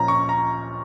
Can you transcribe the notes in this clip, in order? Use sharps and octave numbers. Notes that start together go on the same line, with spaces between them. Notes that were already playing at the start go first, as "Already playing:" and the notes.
Already playing: A#2 F3 C#4 A#5
C#6
A#5